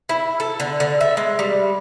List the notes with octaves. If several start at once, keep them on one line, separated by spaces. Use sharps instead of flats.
E4
A4
D3
D3
E5
G#3
G3